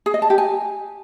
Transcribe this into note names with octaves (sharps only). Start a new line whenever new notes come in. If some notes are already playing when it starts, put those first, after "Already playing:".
G#4
D#5
A5
G4
G#5